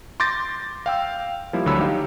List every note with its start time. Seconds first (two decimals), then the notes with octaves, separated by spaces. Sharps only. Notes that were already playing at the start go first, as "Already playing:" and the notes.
0.20 C6 D6 G6 A6 A#6
0.86 F5 G5 E6
1.53 F3 G3 A#3 E4
1.66 D2 D3 F#3 C#5 B5 E6
1.79 D#4 G4 F5